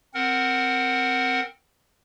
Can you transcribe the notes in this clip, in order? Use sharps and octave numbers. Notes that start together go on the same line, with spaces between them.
C4 A#4 F#5